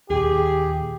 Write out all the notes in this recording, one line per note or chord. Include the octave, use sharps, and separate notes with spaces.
D#2 A#2 G4 G#4